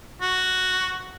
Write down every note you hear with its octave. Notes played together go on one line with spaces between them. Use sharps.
F#4